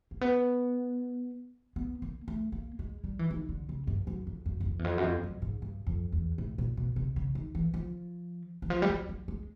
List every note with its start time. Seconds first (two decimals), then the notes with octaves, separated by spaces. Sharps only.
0.11 A#3
0.21 B3
1.76 B3
2.02 A#3
2.28 A3
2.52 A#3
2.79 G#3
3.04 G3
3.19 E3
3.31 D#3
3.49 D3
3.69 C#3
3.87 G2
4.07 F#2
4.27 F2
4.46 F#2
4.60 F#2
4.65 F2
4.79 E2
4.84 F2
4.98 F#2
5.04 F2
5.23 F#2
5.42 G#2
5.62 G2
5.87 F2
6.12 E2
6.38 A2
6.58 A#2
6.77 B2
6.96 C3
7.16 C#3
7.35 D#3
7.55 E3
7.74 F3
8.62 E3
8.70 F3
8.82 G3
8.89 F#3
9.09 F#3
9.28 G#3